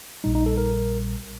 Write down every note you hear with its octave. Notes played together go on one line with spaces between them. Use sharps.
A#1 A#2 G3 D#4
D#4
A4
A#4